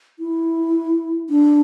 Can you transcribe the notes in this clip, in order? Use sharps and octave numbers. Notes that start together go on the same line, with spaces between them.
E4
D4